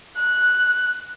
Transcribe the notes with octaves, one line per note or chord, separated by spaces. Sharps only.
F#6